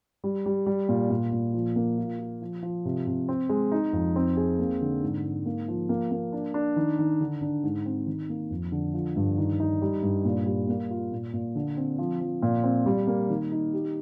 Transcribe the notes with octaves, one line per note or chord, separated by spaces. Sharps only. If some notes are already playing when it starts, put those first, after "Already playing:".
G3
G3
G3
A#2
A#2
A#2
F3
A#3
F4
F4
F3
F3
C3
C3
C4
G#3
D#4
F2
C4
G#4
A#3
D3
G#2
G#2
A#3
F3
A#3
A#3
D4
D4
D#3
D#3
D3
D4
G#2
C4
D#3
A#3
F2
D3
F3
G2
D#3
D#4
G3
G2
A#2
G3
A#3
F4
A#2
A#2
D3
C4
F3
F3
A#2
C4
G3
A#3
D#3
D#4
G4